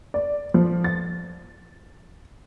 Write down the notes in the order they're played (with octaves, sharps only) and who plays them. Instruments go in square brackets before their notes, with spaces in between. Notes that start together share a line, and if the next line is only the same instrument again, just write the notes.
[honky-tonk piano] D5
F3
A6